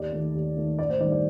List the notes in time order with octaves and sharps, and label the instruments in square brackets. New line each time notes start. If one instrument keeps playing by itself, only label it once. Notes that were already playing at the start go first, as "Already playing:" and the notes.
Already playing: [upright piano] D#2 D5
D#3 A3
D#2
D#3 A3
A1 D5
C5
G2 D#3 D5
D5